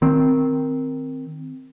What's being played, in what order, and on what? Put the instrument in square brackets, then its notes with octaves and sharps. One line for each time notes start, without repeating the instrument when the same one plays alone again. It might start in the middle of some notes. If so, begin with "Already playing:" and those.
[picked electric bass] D#3 C4